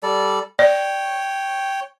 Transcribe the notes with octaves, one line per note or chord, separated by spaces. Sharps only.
G3 A4 D5
C#5 D5 G5